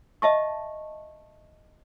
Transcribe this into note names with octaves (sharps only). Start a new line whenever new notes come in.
D#5 E5 A5 C#6